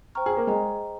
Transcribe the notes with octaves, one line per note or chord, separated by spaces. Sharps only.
C5 G5 A#5 C#6 F6
G#4
A#3
G#3 G#4 D#5 G5 A#5